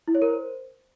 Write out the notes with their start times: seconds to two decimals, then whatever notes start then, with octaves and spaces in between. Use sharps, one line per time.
0.08 E4
0.15 C#5
0.22 A#4
0.29 C5